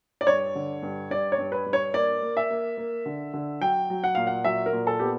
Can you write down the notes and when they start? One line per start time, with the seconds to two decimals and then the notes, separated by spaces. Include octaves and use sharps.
0.21 D5
0.27 G2 C#5
0.55 D3
0.82 G2
1.10 G2 D5
1.32 C#5
1.38 G2
1.52 B4
1.66 G2
1.73 C#5
1.94 A#3 D5
2.22 A#3
2.37 E5
2.50 A#3
2.77 A#3
3.06 D3
3.34 D3
3.61 F#3 G5
3.90 F#3
4.04 F#5
4.15 A#2 F5
4.27 F#5
4.44 F#3 E5
4.66 A#4
4.73 A#2
4.87 A4
4.99 B3 G4